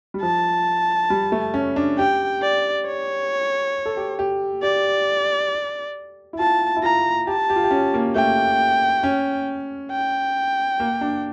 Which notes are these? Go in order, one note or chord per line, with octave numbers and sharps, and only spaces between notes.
G3
F3 A5
G3
A3
C#4
D4
G4 G5
D5
C#5
A4
G4
G4
G4 D5
E4
F4 A5
E4
F4 A#5
G4 A5
G4
F4
G4
C#4
A#3
A3 G5
C#4
G5
A#3
D4